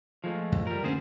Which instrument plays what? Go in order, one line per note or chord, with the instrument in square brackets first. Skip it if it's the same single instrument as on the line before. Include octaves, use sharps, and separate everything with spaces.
[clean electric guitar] F3 G#3 A3
[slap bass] F#2 E3
[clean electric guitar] G3 A#4
[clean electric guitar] D2 G#4 C5 [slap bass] D3 A#3 C#4